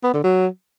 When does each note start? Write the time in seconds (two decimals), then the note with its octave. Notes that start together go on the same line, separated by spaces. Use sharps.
0.03 B3
0.14 D3
0.24 F#3